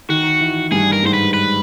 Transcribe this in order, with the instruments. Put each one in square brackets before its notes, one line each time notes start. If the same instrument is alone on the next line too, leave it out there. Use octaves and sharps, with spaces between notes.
[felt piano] D#3 [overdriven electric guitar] F#4
[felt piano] E3
[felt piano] G2 G3 [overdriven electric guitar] G#4
[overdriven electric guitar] A#4
[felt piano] G#2 G#3 [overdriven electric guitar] C5
[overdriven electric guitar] B4
B4